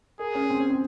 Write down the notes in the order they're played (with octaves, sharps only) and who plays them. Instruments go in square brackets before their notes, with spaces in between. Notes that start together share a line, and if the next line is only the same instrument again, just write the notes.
[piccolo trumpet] G#4 [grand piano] A#4
[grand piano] C#4
C4
C#4
C4